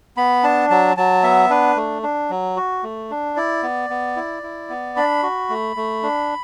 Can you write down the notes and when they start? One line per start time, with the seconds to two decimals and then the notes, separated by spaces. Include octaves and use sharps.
0.17 B3 B5
0.43 D4 A5
0.70 F#3 A5
0.97 F#3 A5
1.23 B3 E5
1.50 D4 B4
1.77 A3
2.03 D4
2.30 F#3
2.56 F#4
2.83 A3
3.10 D4
3.36 E4 D5
3.63 B3
3.90 B3
4.16 E4
4.43 E4
4.70 B3
4.96 D4 B5
5.23 F#4
5.49 A3
5.76 A3
6.03 D4